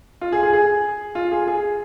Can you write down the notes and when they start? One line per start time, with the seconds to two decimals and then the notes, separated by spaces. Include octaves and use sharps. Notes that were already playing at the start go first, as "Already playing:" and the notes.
0.21 F4
0.32 G#4
0.43 G#4
0.53 G#4
1.15 F4
1.32 G#4
1.48 G#4